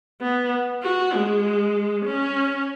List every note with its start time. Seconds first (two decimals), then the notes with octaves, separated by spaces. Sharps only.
0.22 B3
0.83 F#4
1.14 G#3
2.05 C#4